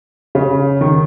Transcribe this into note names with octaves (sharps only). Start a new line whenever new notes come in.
C#3
D#3